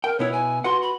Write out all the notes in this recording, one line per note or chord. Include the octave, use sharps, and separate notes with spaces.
A#4 G5
B2 B3 E4 C#5
G#5
F#4 B4 F#5 C6
B5